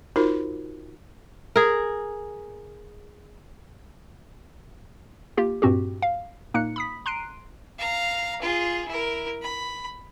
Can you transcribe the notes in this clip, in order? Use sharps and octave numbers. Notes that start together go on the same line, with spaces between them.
D#4 F4 F#4 A#4 C5
G#4 A#4
A#3 F4 G4
G2 A#2 C4 F#4 G4
F5
A#2 A#3 D#4 F#6 C#7
B5 D#6 B6
A#5 C6 F#6 C7 D7 D#7
F5 A#5
F4 G#4
E4 A#4
B5